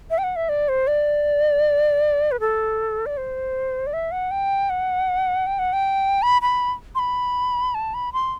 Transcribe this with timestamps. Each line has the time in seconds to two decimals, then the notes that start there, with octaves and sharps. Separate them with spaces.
0.11 E5
0.18 G5
0.24 F#5
0.36 E5
0.49 D5
0.69 C5
0.87 D5
2.32 B4
2.40 A4
3.06 D5
3.17 C5
3.87 D5
3.93 E5
4.12 F#5
4.31 G5
4.70 F#5
5.47 G5
5.59 F#5
5.73 G5
6.22 B5
6.42 B5
6.95 C6
6.99 B5
7.75 A5
7.94 B5
8.13 C6